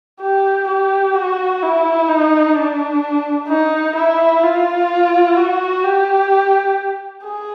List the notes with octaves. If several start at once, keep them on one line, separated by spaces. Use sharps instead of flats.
G4
G4
F#4
E4
D#4
D4
D#4
E4
F4
F#4
G4
G#4